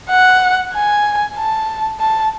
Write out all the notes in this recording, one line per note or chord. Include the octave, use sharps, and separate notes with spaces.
F#5
G#5
A5
A5